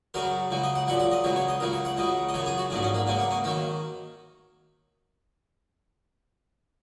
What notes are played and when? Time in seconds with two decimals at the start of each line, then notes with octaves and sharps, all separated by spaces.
0.14 F#2 C#3 F#3 A#4
0.51 C#2 C#3 F#3
0.63 D#5
0.75 F#5
0.87 A#1 A#2 F#3 F#5
0.99 F#5
1.12 D#5
1.24 C#2 C#3 F#3 C#5
1.36 C#5
1.48 D#5
1.60 C#2 C#3 F#3 A#4
1.73 C#5
1.85 F#5
1.97 C#2 C#3 F#3 D#5
2.29 D#5
2.34 F#2 C#3 F#3 C#5
2.46 G#4
2.58 F#4
2.70 A#1 G#2 F#3 C#4
2.83 C#4
2.94 A#3
3.07 C#2 C#3 F#3 C#4
3.19 A#3
3.31 C#4
3.44 D#3 F#3 A#3